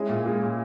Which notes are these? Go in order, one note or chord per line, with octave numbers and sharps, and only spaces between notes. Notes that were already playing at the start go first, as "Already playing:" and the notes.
Already playing: G#3 C#4 E4
A#2
G#3
A#2